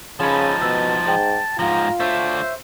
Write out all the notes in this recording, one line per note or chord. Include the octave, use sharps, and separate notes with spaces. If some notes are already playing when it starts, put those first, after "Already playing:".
C#3 F3 D#4 A4 C#5 A5 B5
B2 B4 E6
G#2 D5 G5
G#2 F3 F4 A#5
A3 D4 C5 C#5 E5